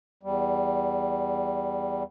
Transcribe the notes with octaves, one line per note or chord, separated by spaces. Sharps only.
E2 G3